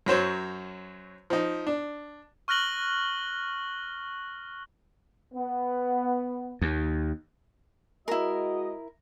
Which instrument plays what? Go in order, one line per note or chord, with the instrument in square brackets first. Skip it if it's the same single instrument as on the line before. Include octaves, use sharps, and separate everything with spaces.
[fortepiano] F#2 F#3 C5 C#5
F3 D#4
D4
[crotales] C#6 F6 F#6 A#6 F#7 G7
[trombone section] B3
[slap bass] D#2
[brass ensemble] G#3 F#4 D#5 [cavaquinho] E4 A#4